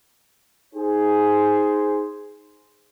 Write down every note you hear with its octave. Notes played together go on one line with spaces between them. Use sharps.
D#4 G#4 C5